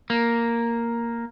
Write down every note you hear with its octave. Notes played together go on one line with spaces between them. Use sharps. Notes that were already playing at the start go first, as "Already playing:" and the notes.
A#3